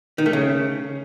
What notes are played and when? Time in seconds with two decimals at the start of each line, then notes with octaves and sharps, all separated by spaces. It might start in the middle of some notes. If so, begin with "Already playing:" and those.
0.18 D#3
0.26 A3
0.33 C#3